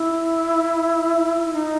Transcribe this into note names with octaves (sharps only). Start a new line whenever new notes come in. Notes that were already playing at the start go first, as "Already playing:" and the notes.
Already playing: E4
E4
D#4